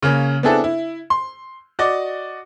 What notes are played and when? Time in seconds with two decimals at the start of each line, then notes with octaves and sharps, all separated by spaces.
0.02 C#3 A#3 C#4
0.43 B3 C4 D4 E4 G#4 A4
0.64 E4
1.10 C6
1.79 F#4 D5 D#5